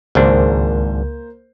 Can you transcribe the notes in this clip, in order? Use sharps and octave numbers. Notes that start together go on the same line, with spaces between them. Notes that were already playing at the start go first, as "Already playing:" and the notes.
G#1 C#2 G#2 A#3 D4 C5